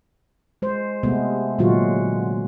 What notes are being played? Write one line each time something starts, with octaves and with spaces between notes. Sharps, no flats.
G#3 C5
C3 G#3 A3 B3
A#2 D3 F#3 G#3 F4 F#4